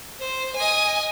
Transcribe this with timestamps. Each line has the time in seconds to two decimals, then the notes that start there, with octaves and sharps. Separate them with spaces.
0.20 C5
0.56 D#5 G#5